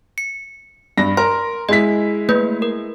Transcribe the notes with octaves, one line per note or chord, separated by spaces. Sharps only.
C#7
G2 A#6
A#4 C6
G#3 E4 D#5 B6
A3 A#3 B4
A#4